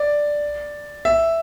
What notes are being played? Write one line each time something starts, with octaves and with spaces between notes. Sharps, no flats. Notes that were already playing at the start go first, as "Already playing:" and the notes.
Already playing: D5
E5